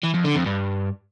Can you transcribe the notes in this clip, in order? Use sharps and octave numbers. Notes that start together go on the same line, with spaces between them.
E3
F2
D3
F2
G2